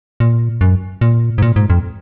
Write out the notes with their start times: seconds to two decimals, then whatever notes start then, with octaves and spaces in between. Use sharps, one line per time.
0.20 A#2
0.61 F#2
1.01 A#2
1.38 G#2
1.42 A#2
1.56 G#2
1.70 F2